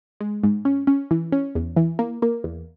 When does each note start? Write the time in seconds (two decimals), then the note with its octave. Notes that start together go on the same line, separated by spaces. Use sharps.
0.20 G#3
0.43 G#2
0.65 C#4
0.87 C#4
1.11 E3
1.32 C#4
1.55 E2
1.77 E3
1.99 A#3
2.22 A#3
2.44 E2